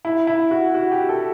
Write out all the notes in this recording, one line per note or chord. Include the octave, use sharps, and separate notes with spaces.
E4
E4
F#4
F#4
G4
A4